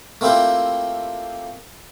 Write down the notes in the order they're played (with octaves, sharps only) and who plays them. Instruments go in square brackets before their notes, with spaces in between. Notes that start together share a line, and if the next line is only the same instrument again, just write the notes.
[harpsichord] A3 A#3 C4 E4 F4 G4